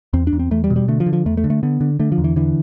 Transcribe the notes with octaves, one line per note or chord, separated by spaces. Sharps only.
E2 C4
D4
E2
C4
E2 A3
G3
B2
G3
D3 A3
F3
D3
F3
E2 A3
A3
D3
A3
D3 B3
D3
D3 A3
F3
E2
E3
D3 E3